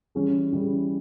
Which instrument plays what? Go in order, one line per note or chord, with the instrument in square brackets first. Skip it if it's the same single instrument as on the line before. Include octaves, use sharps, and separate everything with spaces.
[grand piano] E3 G3 C#4 E4 G#4
E3 G3 C#4 E4 G#4